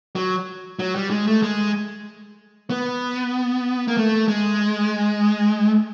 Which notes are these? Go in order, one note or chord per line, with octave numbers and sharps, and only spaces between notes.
F#3
F#3
G3
G#3
A3
G#3
B3
A#3
A3
G#3